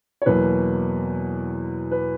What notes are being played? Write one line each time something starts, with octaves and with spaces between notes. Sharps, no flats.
C#5
E2 B2 F#3 A#3 B4
B4